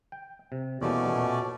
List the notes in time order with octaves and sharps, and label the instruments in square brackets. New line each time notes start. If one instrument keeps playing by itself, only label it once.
[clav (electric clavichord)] G5
C3
[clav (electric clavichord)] E2 G3 A#3 [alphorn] B2 [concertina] A3 C#4 D5
[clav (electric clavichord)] A#2